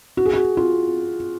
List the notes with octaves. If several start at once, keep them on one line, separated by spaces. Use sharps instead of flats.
F#4
G#4
F#4
F4